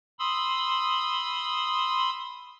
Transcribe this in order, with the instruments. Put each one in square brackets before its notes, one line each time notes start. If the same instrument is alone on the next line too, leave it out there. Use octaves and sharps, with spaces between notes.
[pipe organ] B5 C6 D#6 E6